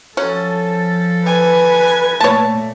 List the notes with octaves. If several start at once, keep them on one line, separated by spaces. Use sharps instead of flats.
F3 F#3 C#4 A4
B4 G#5
A#2 A3 C#5 A5